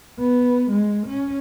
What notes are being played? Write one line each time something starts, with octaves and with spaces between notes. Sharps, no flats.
B3
G#3
C#4